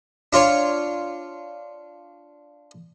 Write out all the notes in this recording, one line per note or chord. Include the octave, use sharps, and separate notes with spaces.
D4 F4 C#5